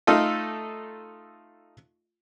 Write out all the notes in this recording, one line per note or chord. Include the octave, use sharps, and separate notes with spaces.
A3 D#4 F4 A4